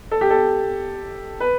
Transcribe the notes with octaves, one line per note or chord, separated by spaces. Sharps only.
A4
G4
A4
B4